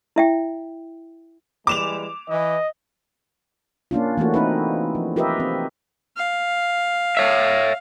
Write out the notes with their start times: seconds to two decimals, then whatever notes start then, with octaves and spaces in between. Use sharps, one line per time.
0.16 E4 E5 G5
1.67 E3 G3 G#3 D6 E7 F7
2.29 E3 D#5
3.91 A#3 C#4 D4 F4
4.17 E3 A3 A#3 F#4
4.34 C4 D#4 E4 B4
4.95 F3
5.16 F4 G4 A#4 B4 D#5 E5
5.40 C4
6.17 F5
7.17 C#5 E5